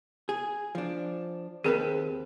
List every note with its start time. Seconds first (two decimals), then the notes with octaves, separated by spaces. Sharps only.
0.29 G#4
0.75 F3 D4
1.64 D#2 C4 G#4 A#4 B4